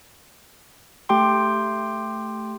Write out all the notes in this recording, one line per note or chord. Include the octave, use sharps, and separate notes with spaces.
A3 G4 G5 C6